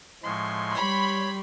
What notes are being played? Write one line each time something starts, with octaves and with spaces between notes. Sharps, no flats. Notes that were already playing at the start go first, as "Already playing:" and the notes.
A2 F3 G#3 C6 C#6
G3 G4 C#5 B5